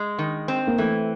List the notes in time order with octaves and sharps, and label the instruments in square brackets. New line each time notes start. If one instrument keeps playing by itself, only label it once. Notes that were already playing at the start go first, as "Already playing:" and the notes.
Already playing: [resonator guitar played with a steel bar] G#3
D#3
C4
[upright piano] A#3
[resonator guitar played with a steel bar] E3 [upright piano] A3